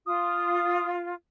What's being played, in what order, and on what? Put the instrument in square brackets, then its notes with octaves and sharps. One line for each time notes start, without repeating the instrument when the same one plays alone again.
[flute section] F4 [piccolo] D#6